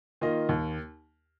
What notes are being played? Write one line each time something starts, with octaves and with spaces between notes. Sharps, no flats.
D#3 A#3 F4 D#5
D#2